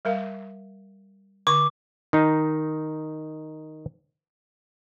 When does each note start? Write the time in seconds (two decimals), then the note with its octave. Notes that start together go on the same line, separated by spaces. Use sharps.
0.05 G3 A#4 F5
1.47 D3 C#6 D6
2.13 D#3 D#4